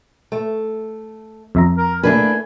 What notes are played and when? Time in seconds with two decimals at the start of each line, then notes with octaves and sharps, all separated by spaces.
0.32 A3
1.55 F2 E5 A#5
1.78 A#4
2.03 A3 A#3 D4 E4 B4 G#5